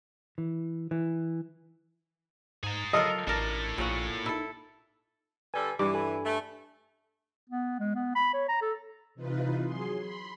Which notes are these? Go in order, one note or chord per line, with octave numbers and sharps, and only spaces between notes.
E3
E3
G#2 G#4 A#5
F#3 F4 A4 A#4 D#5
A1 D4 E4 A4 A#4
A#1 A#2 C#5 F#5
D#4 E4 A4
D3 G3 A4 B4 G#5
G2 E3 D6
A4 G#5 B5
A3
B3
G#3
B3
B5
C#5
A#5
A4
C3 E3 D#4 F4 B4
F#3 G#4 C6
B5 C6